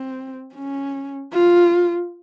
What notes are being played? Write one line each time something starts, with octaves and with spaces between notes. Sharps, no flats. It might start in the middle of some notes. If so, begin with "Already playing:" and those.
Already playing: C4
C#4
F4